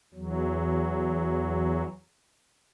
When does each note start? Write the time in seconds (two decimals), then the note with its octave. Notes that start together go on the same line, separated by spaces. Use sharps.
0.14 E2 F#3